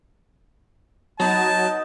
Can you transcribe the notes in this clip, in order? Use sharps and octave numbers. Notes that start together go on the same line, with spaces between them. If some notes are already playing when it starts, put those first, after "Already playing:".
F#3 B3 D#4 A5